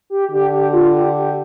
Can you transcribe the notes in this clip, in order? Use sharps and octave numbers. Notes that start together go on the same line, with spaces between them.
G4
D3 G4
G4
F4
G4
G4